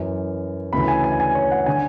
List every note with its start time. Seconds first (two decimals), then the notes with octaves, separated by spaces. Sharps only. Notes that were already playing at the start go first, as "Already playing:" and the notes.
Already playing: F#2 E3
0.73 D2 C#3 E3 B5
0.88 G#5
1.04 G#5
1.20 G#5
1.35 C#5
1.51 F#5
1.66 D3 G#5